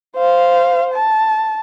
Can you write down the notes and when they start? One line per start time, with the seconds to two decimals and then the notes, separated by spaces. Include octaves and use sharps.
0.16 C5 F5
0.94 A5